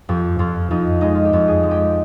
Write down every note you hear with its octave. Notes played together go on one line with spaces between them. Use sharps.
F2 G4
F2 F4
F2 D#4
G#3 D#4
F4
G4
F2
G#4
G#3
G4